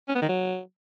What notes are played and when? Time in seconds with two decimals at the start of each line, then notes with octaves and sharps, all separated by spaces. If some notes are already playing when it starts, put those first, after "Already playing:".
0.08 C#4
0.15 B3
0.22 D#3
0.29 F#3